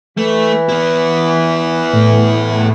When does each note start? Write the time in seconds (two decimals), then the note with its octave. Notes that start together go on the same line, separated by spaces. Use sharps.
0.17 E3 A3
0.69 B3 E4
1.93 A2